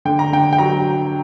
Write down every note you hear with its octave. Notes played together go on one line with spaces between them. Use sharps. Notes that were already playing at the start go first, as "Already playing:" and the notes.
D3 G5
A#5
D3 G5
G5
F#3 A#5